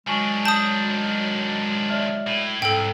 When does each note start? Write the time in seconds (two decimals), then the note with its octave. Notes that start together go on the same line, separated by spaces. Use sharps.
0.07 D#3 F#3 G#3 D4 G#5 C#6
0.45 A5 D#6 G6
1.90 D5 E5 F6
2.27 A2
2.62 C2 G#2 A4 G5